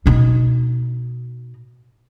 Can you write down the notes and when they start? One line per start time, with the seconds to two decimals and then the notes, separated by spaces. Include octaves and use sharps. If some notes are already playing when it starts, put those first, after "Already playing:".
0.06 B2 D#4